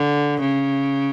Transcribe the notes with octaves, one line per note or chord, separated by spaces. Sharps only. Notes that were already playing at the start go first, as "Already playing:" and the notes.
Already playing: D3
C#3